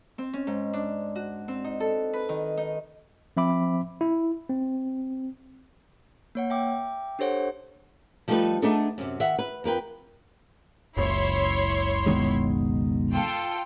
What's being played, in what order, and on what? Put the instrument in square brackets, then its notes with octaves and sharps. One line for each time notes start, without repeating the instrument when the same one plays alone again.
[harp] C4
C#4
G#2
D4
F#4
C4
D#4
A4
B4
D#3
D#4
[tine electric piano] F3 C4 E5 B5 D6
E4
C4
[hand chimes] A#3 C#5 F#5
E5 G5 D6
D4 G4 A4 C5 C#5 F#5
[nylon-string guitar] F3 G3 A3 D#4 A4 B4
A3 B3 D4 D#4 G#4 A4
F#2 C3
D#3 E5 F#5
B4
F2 A#4 B4 G5
[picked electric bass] F#1 C#2 [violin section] E4 C#5 C6
[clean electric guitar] B2 D#3 G#3
[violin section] F4 A4 G5